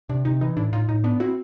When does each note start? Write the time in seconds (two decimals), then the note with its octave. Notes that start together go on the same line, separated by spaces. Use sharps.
0.09 C3 D4
0.25 C3 D#4
0.41 E3 D#4
0.57 A2 D4 E4
0.72 A2 D#4 F4
0.88 A2 D#4
1.04 B3 D4
1.20 C4 E4 F#4